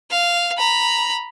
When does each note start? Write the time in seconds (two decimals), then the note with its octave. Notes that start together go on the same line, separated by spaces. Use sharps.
0.11 F5
0.58 A#5 B5